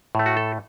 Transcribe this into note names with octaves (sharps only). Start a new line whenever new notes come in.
A2 A3
F#4
A4